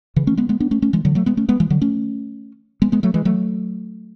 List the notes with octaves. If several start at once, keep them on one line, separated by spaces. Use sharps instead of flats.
C#3 E3
A3 C#4
G#3 B3
G#3 B3
B3 D4
A3 C#4
A3 C#4
E3 G#3
D3 F#3
F#3 A3
G#3 B3
A3 C#4
G#3 B3
E3 G#3
D3 F#3
A3 C#4
G#3 B3
G#3 B3
F#3 A3
E3 G#3
F#3 A3